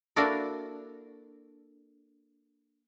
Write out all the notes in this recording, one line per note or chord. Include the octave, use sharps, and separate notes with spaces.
A#3 D4 E4 F#4 A4 A#4